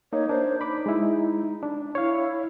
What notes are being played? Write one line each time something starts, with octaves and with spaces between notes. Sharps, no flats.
A#3 D#4 C#5
D4 C5
D#4 B5 D6
G#3 E4
D4
E4 C#5 F5